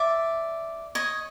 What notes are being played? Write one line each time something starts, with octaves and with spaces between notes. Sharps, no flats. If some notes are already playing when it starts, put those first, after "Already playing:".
Already playing: D5 E5
C#5 D#5